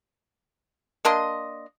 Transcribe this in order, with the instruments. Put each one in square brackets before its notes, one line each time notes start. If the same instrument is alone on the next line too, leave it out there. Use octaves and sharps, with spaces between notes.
[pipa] A#3 D4 D#5 C6